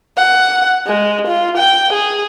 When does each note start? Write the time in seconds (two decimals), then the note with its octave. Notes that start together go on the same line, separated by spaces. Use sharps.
0.17 F#5
0.87 G#3
1.27 F4
1.57 G5
1.93 G#4